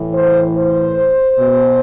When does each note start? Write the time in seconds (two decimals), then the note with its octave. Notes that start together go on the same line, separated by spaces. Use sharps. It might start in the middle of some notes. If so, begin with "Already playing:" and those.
Already playing: A2 E3
0.13 C5
0.55 C5
1.39 B2